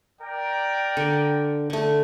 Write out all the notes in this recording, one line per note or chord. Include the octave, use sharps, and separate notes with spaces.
A#4 D5 G5
D3
D3 A3